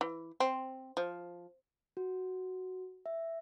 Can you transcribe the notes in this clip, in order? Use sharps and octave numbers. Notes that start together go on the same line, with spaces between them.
E3
C4
F3
F#4
E5